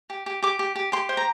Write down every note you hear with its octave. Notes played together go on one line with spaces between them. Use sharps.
G4
G4
G4 D6
G4
G4
G4 C6
C5
A#5